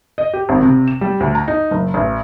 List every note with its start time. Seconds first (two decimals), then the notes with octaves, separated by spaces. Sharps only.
0.18 D#5
0.34 G4
0.49 G#1
0.62 C3
0.88 E7
1.01 G3
1.20 D2
1.35 A#5
1.48 D#4
1.71 F#1
1.94 A1